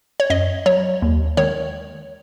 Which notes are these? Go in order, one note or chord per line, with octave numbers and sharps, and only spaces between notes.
C#5
F#2 D#5
F#3 C#5
D#2
D#3 G#3 C#5